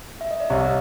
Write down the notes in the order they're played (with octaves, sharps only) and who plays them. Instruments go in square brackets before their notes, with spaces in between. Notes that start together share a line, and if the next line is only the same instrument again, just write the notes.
[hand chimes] E5
D#5
D5
[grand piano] C2 [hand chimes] C#5